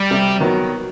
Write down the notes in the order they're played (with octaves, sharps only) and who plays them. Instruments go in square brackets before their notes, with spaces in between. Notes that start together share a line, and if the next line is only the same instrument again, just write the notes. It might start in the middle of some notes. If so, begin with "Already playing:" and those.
Already playing: [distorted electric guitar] G3
[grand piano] C3
D#3 F#3 B3